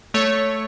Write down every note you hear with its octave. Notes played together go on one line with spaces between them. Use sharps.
A3 C#5